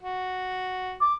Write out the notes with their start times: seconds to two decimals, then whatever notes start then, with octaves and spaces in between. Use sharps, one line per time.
0.03 F#4
1.01 D6